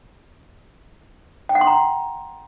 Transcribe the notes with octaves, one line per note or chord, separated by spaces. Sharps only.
G5
F#5
C6
A#5